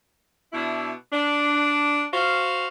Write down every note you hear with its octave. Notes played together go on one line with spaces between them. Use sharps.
B2 D4 E4
D4
F#4 C5 F5